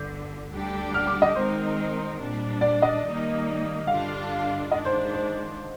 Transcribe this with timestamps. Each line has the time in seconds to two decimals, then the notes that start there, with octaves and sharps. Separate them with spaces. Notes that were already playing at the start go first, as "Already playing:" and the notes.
Already playing: G1 G2 D3 G6
0.52 D2 D3 G3 D4 G4
0.94 F6
1.07 D6
1.22 D#5
1.35 D#3 G#3 C4 D#4 A#4 C5
2.20 A#2 G3 D4
2.61 D5
2.82 D#5
3.04 D#3 G3 A#3 D#4
3.87 G2 D3 G3 D4 F4 F5
4.71 D#3 G#3 D4 D#5
4.85 C5
5.14 C5